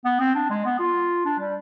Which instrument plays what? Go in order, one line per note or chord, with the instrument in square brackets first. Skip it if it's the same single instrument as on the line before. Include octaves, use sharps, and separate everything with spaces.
[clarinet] B3
C4
D4
G#3
B3
F4
D4
G3